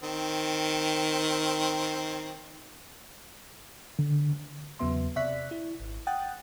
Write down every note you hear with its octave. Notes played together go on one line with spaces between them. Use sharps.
D#3 C4
D3
E2 C#3 F#3 B3 E5 C6
C3 D5 E5 C#6 F#6 B6
E4
G#1
F#5 G5 D#6 F#6 A6